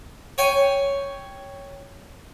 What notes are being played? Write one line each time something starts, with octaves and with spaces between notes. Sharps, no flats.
C#5 G5 G#5